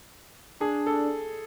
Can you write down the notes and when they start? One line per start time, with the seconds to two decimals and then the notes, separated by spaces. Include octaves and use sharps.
0.60 D4 G#4
0.87 A4